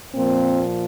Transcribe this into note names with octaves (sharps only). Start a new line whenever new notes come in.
A#2 F3 A#3 C4